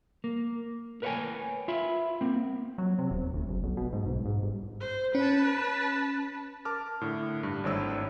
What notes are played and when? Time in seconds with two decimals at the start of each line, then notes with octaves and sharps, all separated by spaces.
0.24 A#3
1.02 A#4 B4 C#5 D#5 G5 G#5
1.68 F4 E5 B5
2.21 A#3 C4
2.78 F#3
2.99 C3
3.11 D#1
3.34 D2
3.49 F#1
3.64 B1
3.77 B2
3.93 G#2
4.06 B1
4.25 G#2
4.42 G1
4.80 C5
5.15 C#4 B4 A5
6.65 A#4 A5 D6 F6
7.01 A2 D3
7.43 G2
7.64 G#1 A2 D4 E4 C#5 E6